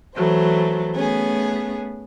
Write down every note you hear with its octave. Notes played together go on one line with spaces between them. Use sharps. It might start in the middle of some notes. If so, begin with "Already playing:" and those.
E3 F#3 A3 C5
A3 B3 C#4 G#4